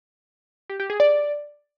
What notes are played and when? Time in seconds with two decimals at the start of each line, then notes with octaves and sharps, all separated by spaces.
0.70 G4
0.80 G4
0.90 G#4
1.00 D5